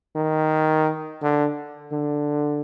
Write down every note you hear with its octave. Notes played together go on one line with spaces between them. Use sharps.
D#3
D3
D3